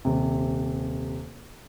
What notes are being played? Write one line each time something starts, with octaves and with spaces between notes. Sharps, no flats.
D#1 C3